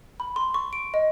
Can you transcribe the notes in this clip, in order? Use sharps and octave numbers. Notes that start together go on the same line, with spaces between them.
B5
C6
C#6
D7
D#5